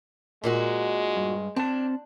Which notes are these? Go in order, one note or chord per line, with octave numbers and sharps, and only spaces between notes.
A#2 G#3 D#4 F#4
G2
C4 D4 A5